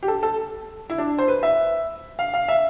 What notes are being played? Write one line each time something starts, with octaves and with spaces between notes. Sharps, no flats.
G4
A4
A4
E4
D4
C5
B4
E5
F5
F5
E5